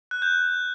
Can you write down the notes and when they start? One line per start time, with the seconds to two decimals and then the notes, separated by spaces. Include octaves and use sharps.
0.11 F#6
0.22 G6